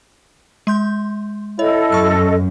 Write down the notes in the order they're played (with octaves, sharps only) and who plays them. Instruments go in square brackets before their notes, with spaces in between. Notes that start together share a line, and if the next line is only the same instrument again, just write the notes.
[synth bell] G#3 C6 G6
[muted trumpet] E4 [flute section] A4 D#5 [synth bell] C#5
[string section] F#2 [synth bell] C#6 F6